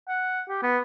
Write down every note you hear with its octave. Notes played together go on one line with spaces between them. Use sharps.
F#5
G4
B3